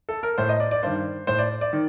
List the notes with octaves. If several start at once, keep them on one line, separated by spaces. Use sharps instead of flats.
A4
A#4
A2 C5
D#5
D5
D5
G2 D#3 C5
A2 C5
D5
D5
D#3